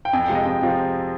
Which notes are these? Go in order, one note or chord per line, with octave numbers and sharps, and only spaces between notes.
G5
F2 G#5
G5
C3 F3 G#3
D#5
F2 G5
C3 F3